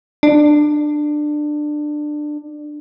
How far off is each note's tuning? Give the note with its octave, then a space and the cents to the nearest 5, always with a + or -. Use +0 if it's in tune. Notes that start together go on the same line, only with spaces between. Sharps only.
D4 +20